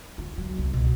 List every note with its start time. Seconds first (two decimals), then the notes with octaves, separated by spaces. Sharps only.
0.18 F4
0.38 F#3
0.58 C2
0.73 B2